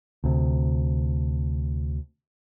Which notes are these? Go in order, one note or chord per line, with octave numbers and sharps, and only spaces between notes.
D2 C3